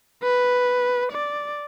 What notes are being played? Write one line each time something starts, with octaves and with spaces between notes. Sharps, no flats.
B4
D5